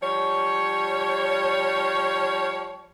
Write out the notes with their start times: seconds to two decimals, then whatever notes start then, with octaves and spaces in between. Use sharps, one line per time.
0.02 F3 G3 C#5